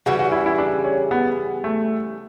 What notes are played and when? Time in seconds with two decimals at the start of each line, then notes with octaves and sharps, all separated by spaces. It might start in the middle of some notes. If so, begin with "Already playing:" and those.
0.06 C#3 E3 G3 F#4
0.19 F#4
0.32 E4
0.46 E4
0.58 D4
0.84 C#4
1.11 B3
1.64 A3